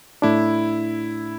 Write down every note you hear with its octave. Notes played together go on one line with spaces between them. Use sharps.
A2 A3 D4 E4